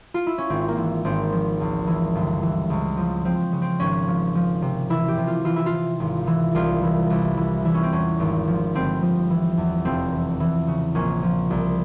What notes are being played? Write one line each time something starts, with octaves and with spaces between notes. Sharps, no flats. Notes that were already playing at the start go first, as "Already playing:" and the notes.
F4
E4
C#4
G#1 C4
A#3
E3
G#1 C4
F3
C#2
E3
G1
E3
C#2
F3
F3 C4
C#3
C4
G#1 C#4
F3
F3
C3
E3 E4
G4
C3
F4
E3 F4
E4
F4
C3
G#1
E3
C2 F4
E3
C2
E3
E3 E4
C#4
C4
E2 C#4
G#1
F3
G1 C4
F3
E3
E2
F1 C4
E3
E3
C#3
A#1 C#4
F3
C2